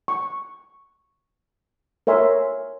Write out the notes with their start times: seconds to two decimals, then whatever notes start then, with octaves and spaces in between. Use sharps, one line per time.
0.08 C#6
2.07 A#4 C#5 E5 G#5 C6